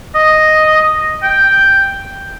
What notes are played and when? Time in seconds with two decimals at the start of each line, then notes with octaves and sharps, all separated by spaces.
0.15 D#5
1.22 G5